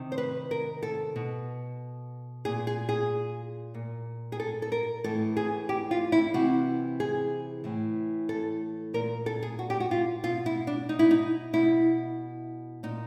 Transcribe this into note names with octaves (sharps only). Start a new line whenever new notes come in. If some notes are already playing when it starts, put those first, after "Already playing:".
Already playing: C3 D#3
C5
B4
A#4
A4
B2
A#2 G#4
G#4
G#4
A#2
G#4
A4
A4
A#4
A2 E3 A4
G#4
G4
F4
E4
C3 E3 F#4
G#4
A2 E3
A4
A#2 A#4
A4
G#4
F#4
G4
F#4
F4
B2 F4
E4
D4
D#4
E4
D#4
B2 E4
A#2 D#4